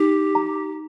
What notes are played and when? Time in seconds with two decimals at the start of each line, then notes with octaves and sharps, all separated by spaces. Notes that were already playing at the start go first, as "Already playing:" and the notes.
Already playing: D#4 G4
0.35 A#5